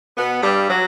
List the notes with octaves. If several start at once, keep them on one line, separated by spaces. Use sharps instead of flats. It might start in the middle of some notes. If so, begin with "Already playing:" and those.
B2 B3
G2 G3
F#3